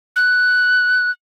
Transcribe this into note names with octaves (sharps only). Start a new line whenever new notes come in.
F#6